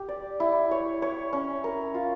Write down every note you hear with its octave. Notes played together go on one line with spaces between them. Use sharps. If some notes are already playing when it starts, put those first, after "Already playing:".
Already playing: G4
D5
E4
C#5
C#5
C#4
A#4
F4